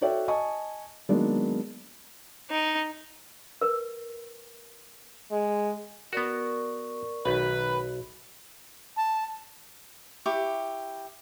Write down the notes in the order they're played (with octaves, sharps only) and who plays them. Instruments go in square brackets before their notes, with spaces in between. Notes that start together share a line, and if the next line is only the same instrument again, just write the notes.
[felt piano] F#4 A4 C#5 D5 E5 G5
D#5 G#5 A5 C#6
D#3 F#3 G#3 A#3 B3 D4
[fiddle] D#4
[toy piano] A#4 B4
[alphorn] G#3
[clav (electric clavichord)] B3 F#4 [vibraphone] A#4 D5 C#6
[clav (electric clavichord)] B1 [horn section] D#3 B4
[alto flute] A5
[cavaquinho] E4 G4 C#6